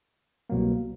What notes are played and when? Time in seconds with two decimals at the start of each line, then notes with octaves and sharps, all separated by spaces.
0.50 C2 B2 F#3 A#3